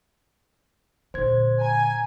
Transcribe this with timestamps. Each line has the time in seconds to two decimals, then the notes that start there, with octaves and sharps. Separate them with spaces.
1.14 A#2 D3 C5 G#6
1.61 G#5 A#5